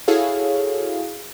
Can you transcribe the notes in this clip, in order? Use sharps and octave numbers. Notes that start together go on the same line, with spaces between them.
E4 F#4 G#4 A4 C#5 F5